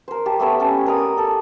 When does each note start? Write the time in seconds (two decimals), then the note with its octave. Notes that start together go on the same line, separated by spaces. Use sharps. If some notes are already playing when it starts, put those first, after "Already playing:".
0.08 A#4 C5
0.26 G4 A5
0.40 A3 B3 C#5 E5
0.60 C#4 A5
0.86 A#4 D5 A#5 D#6
1.17 A4